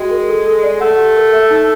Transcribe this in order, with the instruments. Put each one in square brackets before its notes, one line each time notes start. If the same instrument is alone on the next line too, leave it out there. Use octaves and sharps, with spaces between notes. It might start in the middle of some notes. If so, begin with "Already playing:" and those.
Already playing: [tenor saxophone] G#3 [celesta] F#4 G5
[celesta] A#4
A4
A4
D5
[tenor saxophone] A3 [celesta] F#5
[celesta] G4
A#4
E5
D#4